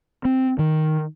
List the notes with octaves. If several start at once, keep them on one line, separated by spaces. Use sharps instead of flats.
C4
D#3